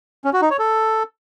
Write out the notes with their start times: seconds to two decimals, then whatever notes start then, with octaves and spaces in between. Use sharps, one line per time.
0.25 C#4
0.33 F#4
0.42 D#4
0.50 C#5
0.59 A4